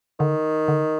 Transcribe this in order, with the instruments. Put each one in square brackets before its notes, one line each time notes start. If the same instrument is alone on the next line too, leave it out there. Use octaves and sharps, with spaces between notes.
[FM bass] D3 [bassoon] D#3
[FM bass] D3